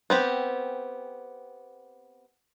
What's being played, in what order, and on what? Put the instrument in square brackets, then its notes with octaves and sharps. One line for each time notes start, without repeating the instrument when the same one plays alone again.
[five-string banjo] B3 C4 G4